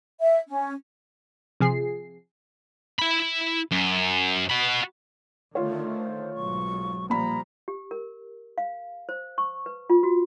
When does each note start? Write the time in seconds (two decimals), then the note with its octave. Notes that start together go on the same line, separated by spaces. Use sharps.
0.21 E5
0.48 C#4
1.60 C3 F3 G#4 C7
2.99 E4 B5
3.71 F#2
4.50 F#4 B5
5.55 D3 D#3 A3 F4 C#5
5.96 C5
6.34 B1 G#2 F#3 C#6
7.10 A#2 F3 G3 A#5 B5
7.68 G4
7.91 A#4
8.58 F5
9.09 C5
9.38 C#6
9.66 B4
9.90 F4
10.03 F#4